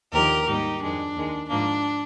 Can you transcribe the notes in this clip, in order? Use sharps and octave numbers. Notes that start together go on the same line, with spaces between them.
D#2 D3 F3 A#3 G4 A#4
G#2 G3 A#3 D#4 G4
F2 D#3 G#3 D4
D#2 D#3 G#3
G#2 F3 A#3 D4